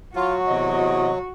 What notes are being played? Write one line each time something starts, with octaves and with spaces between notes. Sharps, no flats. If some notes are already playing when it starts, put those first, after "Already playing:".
F#3 F4 F#4
E2 C3 D#5